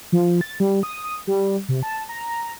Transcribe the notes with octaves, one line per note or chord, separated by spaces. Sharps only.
F3
A6
G3
D#6
G3
C3
A5
A#5